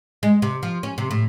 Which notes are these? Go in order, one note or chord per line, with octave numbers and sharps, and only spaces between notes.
G#3
C3
F3
C#4
C3
A2